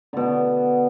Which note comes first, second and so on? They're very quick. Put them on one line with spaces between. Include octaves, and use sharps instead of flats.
D3 B2 B3